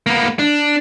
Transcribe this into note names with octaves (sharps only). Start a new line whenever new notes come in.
A#3 B3
D4